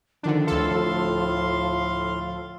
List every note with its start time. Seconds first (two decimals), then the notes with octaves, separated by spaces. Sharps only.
0.23 D3 D#3 F3 D4
0.47 D2 A2 A4 F5 C6